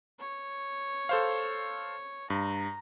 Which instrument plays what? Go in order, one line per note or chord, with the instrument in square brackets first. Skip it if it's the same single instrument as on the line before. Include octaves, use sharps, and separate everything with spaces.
[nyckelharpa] C#5
[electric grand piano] A4 C5 F5
[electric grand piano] G2 [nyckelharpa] A#5